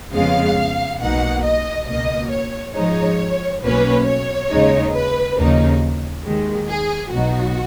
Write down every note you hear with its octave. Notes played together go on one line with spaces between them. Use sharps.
F2 C#3 G#3 B3 F5
B1 B2 A#3 D#4 F#5
D#5
C#2 B2 A#3 D#5
C#5
G#2 F3 G#3 D#4 C#5
B1 B2 A#3 C#4 B4
C#5
D#2 C#3 G#3 D#4
B4
D#2 C#3 F3 A#3 D#4
D#2 D#3 G#3
G#4
B1 B2 F#3 B3 D#4 F#4